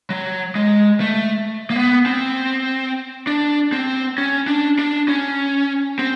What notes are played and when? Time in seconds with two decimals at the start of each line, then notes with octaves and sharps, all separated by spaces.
0.10 F#3
0.55 G#3
1.00 A3
1.70 A#3
1.76 B3
2.06 C4
3.27 D4
3.72 C4
4.18 C#4
4.48 D4
4.79 D4
5.08 C#4
5.99 C4